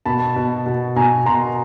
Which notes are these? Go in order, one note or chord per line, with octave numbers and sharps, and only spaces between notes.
B2 A5 B5
B2
B2
B2 G#5 A#5
B2 A#5 C6